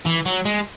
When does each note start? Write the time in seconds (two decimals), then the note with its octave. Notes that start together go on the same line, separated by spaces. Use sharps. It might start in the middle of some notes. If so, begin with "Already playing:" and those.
0.06 E3
0.26 F#3
0.45 G#3